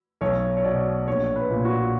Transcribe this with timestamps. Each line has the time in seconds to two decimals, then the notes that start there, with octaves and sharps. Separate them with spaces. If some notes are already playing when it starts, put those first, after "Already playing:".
0.21 B1 C#5
0.57 C#5
0.64 B2 D5
1.07 A#1 C#5
1.36 B4
1.50 A#2
1.65 F#4